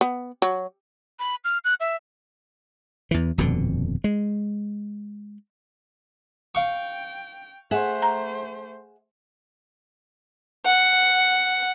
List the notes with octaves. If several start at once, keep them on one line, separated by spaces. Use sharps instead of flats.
B3
F#3
B5
F6
F#6
E5
E2 E3
D#1 F2 B2 D3
G#3
F5 G5 C#6
A3 G#4 C5 E5 F#5
A#5
F#5